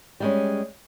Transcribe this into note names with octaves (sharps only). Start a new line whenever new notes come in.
G3 G#3 C#4